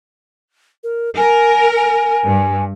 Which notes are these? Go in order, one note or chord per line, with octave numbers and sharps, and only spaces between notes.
A#4
A#4 G#5
G#5
G2